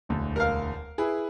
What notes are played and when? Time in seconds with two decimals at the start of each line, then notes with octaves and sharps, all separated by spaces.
0.09 E1 D2
0.36 A#4 F5
0.98 E4 G#4 B4